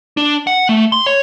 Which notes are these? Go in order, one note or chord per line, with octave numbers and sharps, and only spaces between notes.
D4
F#5
A3
C6
C#5